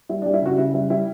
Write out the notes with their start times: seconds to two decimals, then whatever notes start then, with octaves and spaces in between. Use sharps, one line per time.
0.09 G3 E4
0.22 G3 D4
0.34 E4
0.42 C#3 F#4
0.58 C#3 E4
0.74 G3 E4
0.90 G3 E4